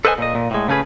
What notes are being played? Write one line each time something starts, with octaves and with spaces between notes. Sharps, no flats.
A4 B4 C5 D#5 E5 G#5
A#2 D#5
A#2
A2 G#3
C#3 A3 C#4 G#4 B4